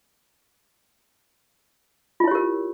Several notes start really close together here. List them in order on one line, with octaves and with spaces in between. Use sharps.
F4 E4 C#5 G4 A#4